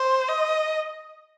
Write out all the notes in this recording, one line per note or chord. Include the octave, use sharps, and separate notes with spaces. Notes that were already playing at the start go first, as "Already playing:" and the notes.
Already playing: C5
D#5